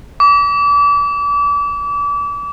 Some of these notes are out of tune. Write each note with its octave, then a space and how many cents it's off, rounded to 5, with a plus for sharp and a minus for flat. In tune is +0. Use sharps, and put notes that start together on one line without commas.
D6 -35